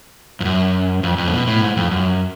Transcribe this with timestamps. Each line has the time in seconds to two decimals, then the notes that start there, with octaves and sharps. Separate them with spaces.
0.40 F2
0.45 F#2
1.03 F2
1.18 F2
1.28 C#3
1.33 B2
1.47 A2
1.62 G#2
1.77 F2
1.91 F#2